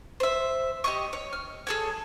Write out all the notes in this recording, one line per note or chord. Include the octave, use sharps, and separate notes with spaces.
C5 E5
G4 D#5 C#6
C#5
F6
G#4 A4 C#5